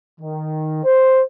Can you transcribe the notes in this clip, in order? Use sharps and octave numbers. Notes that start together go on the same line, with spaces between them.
D#3
C5